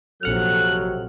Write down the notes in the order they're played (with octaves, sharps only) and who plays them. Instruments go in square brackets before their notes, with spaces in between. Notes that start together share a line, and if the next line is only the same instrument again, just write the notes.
[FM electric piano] A#1 F#5 F6 [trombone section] F2 C3 F#3 [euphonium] A4 [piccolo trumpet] F#6